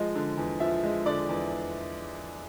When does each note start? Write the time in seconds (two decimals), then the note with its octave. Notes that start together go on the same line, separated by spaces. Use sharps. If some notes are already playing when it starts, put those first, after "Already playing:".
Already playing: F3 G#3
0.15 D3
0.38 E2
0.60 F3 E5
0.84 G#3
1.06 D3 D5
1.29 E2